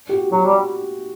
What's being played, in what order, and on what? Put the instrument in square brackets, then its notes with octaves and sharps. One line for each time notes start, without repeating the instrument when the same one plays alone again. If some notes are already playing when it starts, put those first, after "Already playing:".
[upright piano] G4
F#4
[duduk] F#3 [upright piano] F#4
[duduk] G3